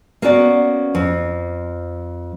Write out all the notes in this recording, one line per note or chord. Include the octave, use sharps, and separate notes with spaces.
A#3 B3 C#4 F#4 D5
F2